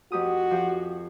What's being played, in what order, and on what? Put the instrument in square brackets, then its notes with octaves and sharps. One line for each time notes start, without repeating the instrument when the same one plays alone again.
[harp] F2 G4 D#6 [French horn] F#4
[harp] F3 G4